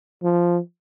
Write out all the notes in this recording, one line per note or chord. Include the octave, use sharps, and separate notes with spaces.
F3